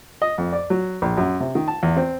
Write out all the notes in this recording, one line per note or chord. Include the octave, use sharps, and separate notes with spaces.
D#5
F2
D5
F#3
A#1
F#2
C3
D#3
A5
E2
C4